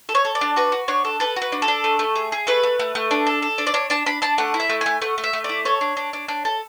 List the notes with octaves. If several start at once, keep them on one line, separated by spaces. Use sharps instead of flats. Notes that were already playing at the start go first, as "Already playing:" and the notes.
A4
C#5
A4
D5
D4
F#4 B4
F#4
D4 C#5
A4
A4 B4
F#4
B4
D4
A4
D4
A3
A3
G#4
G#4
A3 B4
A3
A3
A3
D4
A4
A4
D4
D5
D4 C#5
D4 A5
D4 B5
D4 A5
A3 F#5
E4
E5
A3
A3 G#5
A3 F#5
A3
E5
A3
D5
E4
A4 C#5
D4
D4
D4
D4
A4